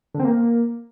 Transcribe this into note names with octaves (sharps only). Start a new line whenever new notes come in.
D3
C4
A#3